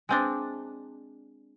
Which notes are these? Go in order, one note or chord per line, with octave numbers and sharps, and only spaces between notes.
G#3 C4 D4